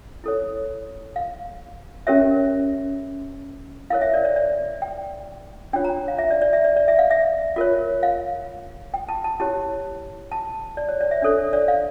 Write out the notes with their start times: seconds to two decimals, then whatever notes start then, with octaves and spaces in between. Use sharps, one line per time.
0.24 E4 A4 C#5
1.16 F5
2.07 C#4 G4 A#4 C#5 E5
3.90 E4 A#4 C#5 F5
4.01 E5
4.14 D5
4.25 D5
4.36 D5
4.82 G5
5.73 D4 F4 C#5 G5
5.84 A#5
6.08 F5
6.18 E5
6.31 D5
6.42 D5
6.53 E5
6.64 D5
6.76 D5
6.88 E5
6.99 F5
7.11 E5
7.56 F4 A#4 C#5
8.03 F5
8.94 G5
9.08 A5
9.24 A5
9.40 E4 G4 C#5 A5
10.32 A5
10.77 D5
10.89 C#5
11.00 D5
11.11 E5
11.22 D4 A4 C#5
11.53 D5
11.68 F5